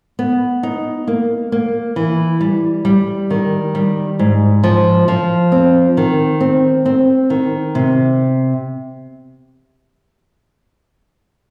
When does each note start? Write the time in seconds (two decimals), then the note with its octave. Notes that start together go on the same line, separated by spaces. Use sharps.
0.19 B3
0.63 D#4
1.07 A#3
1.52 A#3
1.96 E3
2.41 G3
2.85 G3
3.30 D#3
3.75 G3
4.19 G#2
4.64 F3
5.08 F3
5.52 C4
5.97 D#3
6.41 C4
6.86 C4
7.30 D#3
7.75 C3